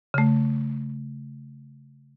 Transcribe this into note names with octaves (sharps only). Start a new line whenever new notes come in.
C#3 A3